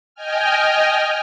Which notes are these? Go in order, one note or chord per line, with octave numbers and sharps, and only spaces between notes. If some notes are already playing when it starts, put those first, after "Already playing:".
D#5 G5 G#5 F6